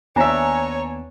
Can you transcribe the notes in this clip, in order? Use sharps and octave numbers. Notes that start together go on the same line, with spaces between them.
D#2 B3 D4 C#5 E5 G#5 A#5